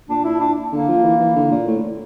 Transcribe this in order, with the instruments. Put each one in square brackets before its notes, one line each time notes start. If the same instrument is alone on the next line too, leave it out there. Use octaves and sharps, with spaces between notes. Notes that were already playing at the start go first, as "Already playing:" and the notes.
[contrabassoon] A#2 [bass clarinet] D4
[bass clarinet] E4
D4
[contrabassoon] D3 [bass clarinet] A#3
[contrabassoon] F3
E3
E3
D3
A#2
A2